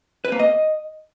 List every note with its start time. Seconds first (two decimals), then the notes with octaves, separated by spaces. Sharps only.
0.25 B4
0.32 A#3
0.39 D#5